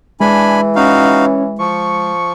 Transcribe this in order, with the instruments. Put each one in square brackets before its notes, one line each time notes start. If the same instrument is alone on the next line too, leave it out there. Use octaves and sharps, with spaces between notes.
[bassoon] E3 [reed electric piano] G#3 [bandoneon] D4 G#5 B5
[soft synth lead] C#4 [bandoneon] D#4 F#4 F5
[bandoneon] F3 [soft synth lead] C#6